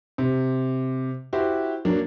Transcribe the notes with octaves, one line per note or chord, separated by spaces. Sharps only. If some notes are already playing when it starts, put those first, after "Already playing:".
C3
E4 F#4 G4 C5
F#3 A#3 D4